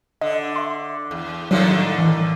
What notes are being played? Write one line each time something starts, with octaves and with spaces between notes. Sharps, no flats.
D3 D#5
E5 C6
E2
A2 D3 D#3 F#3 G3
E3